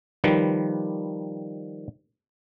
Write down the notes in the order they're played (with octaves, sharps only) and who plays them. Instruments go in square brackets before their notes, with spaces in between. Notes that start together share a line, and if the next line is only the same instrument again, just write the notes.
[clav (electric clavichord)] D#3 F3 G3 B4